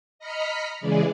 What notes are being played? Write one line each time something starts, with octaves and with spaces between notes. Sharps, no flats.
D#5 A#5 B5 F6 B6 C#7
C#3 E3 G#3 G#4 D5